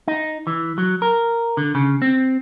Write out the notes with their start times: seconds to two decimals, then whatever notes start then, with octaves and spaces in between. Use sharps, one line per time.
0.08 D#4
0.47 E3
0.78 F#3
1.02 A#4
1.57 D3
1.75 C#3
2.02 C4